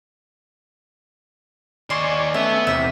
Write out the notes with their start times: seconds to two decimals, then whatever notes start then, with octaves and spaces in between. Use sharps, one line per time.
1.90 D#2 D5 D#5 G#5 C6 C#6
2.34 A3 B3 C#4 E5
2.67 E2 C3 E5